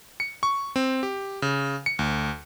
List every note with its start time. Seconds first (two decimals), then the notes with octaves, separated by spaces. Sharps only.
0.20 C#7
0.43 C#6
0.76 C4
1.03 G4
1.42 C#3
1.86 C#7
1.99 D2